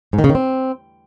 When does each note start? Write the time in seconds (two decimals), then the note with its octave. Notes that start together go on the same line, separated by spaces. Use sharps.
0.13 G#2
0.19 D#3
0.24 C#3
0.29 D#3
0.35 C4